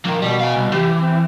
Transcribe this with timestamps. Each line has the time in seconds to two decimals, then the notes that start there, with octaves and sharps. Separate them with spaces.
0.06 D#3 F3 A#3
0.22 B2 G3
0.40 F5 G#5
0.55 C2
0.73 E3 G4
0.98 C4